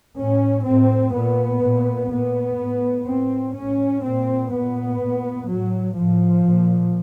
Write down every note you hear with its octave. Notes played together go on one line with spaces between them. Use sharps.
A2 C#4
A2 C4
A#2 B3
A#2
A#2 B3
A2
A2 C4
A2 C#4
A#2 C4
A#2 B3
A#2
A2 F#3
A2 F3
A#2